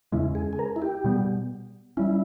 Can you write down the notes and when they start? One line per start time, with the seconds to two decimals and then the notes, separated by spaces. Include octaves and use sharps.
0.12 E2 C#3 G#3 C#4 E4
0.35 G#4
0.53 G#4
0.59 A#4
0.76 E4
0.82 G4
1.04 B2 G3 B3
1.97 G3 C#4 E4